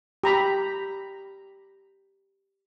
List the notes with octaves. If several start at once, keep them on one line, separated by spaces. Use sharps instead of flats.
G4 A#5 B5